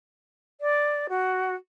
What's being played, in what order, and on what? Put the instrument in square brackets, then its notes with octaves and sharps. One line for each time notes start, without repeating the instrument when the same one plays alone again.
[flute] D5
F#4